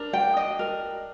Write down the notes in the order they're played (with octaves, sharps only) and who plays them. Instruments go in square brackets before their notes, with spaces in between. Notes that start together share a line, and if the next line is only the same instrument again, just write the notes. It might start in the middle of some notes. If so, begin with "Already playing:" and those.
Already playing: [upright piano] D4 [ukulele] A#4
[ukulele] G5
D#5
A#4